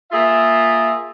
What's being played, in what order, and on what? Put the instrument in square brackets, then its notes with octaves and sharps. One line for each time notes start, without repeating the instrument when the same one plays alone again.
[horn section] A#3 F4 G#4 E5